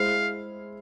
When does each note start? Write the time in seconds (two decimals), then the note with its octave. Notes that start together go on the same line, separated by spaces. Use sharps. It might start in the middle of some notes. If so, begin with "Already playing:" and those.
Already playing: G#3 E4 G#4 C5 F5